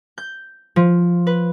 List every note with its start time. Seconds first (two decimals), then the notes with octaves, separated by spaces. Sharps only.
0.18 G6
0.76 F3
1.27 B4